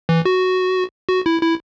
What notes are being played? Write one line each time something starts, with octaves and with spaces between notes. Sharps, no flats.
E3
F#4
F#4
E4
E4